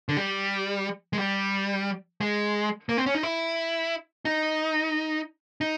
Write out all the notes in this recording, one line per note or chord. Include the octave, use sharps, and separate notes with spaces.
D3
G3
G#3
G3
G#3
A#3
C4
C#4
D#4
E4
D#4
D#4